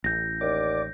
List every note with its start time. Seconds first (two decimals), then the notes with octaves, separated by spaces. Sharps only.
0.04 A1 G6 A#6
0.41 D#2 D5